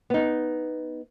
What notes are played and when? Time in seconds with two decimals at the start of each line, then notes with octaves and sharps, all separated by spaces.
0.10 B3 D#4